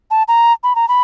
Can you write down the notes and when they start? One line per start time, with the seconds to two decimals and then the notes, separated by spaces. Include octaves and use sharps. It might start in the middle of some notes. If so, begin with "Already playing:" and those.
0.11 A5
0.28 A#5
0.63 B5
0.76 A#5
0.89 B5